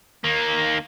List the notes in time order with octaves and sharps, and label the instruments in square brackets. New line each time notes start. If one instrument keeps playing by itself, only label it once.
[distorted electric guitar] D#3 A#3